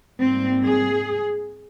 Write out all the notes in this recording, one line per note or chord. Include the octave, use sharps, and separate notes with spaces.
G#2 G3 A#3 C4
G#4